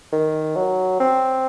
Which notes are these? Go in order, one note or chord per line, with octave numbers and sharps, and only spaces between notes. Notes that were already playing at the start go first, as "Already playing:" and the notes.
D#3
F#3
C4